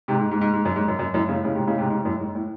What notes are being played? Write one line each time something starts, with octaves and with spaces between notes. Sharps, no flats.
G#2 C3
G#2
G#2
G#2
G#2
F#2
G#2
F#2
F#2
F#2 A2
A2 C#3
A2 C#3
G#2 C3
A2 C#3
G#2 C3
G#2 C3
F#2 A2
G#2
A2